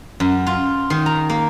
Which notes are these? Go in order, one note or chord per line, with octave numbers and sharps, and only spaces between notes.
F#2
F4
D#3
A#5
A#3